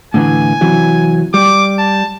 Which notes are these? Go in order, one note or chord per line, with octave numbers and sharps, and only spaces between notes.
A2 D3 E3 G#5
C3 E3 F#3
G3 D6
A5